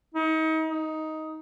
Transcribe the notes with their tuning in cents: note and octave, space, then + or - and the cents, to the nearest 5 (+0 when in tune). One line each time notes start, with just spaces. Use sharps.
D#4 +35
D#4 +10